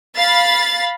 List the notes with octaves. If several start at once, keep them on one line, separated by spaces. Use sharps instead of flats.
F5 B5 A6